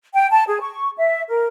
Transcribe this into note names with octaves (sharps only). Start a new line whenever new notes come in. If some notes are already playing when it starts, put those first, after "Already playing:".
G5
A5
G#4
C#6
E5
A#4